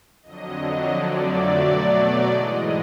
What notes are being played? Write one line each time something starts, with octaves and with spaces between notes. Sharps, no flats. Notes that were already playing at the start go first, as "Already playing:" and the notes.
F2 D3 F#3 D#5
D#5
F2 D3 F#3 A3 D5
B2 F#3 A3
G#2 E3 G#3 D#5